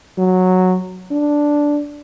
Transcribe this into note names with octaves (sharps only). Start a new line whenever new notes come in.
F#3
D4